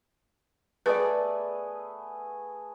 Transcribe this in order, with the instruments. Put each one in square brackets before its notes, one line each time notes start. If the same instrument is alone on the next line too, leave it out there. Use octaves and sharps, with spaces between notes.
[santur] A3 B3 G#4 [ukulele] A4 D5 [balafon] B4